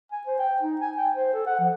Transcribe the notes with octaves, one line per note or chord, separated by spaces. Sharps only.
G#5
C5
G5
D#4
G#5
G5
C5
A4
F#5
F3